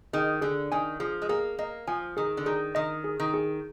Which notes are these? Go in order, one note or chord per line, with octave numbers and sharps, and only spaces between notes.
D#3 G#4
D3 G#4
D#3 G#5
F3 G#4
G#3
A#3 G#4
A#3 D#5
F3 G#5
D#3 G#4
D3
D#3 G#4
D#3 D#5
G#4
D#3
G#4